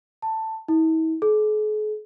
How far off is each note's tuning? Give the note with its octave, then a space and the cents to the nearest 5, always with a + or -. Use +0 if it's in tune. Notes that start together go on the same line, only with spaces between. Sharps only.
A5 +10
E4 -45
G#4 +45